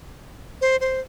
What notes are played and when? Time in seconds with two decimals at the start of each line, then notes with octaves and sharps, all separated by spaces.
0.61 C5
0.81 C5